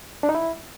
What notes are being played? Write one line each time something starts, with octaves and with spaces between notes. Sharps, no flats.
D4
D#4
E4